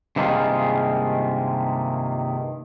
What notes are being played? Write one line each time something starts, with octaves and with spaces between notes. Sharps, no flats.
G2 C3 D#3 G#3 A#3 F4